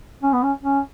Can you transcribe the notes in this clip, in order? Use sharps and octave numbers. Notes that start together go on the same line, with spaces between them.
C#4
B3
C#4
C#4